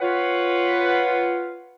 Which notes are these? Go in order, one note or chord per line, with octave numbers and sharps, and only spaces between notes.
F4 B4 C#5 F#5